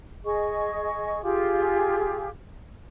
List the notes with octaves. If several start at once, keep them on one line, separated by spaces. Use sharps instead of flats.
G#4 D#5 C#6
F4 G4 G#4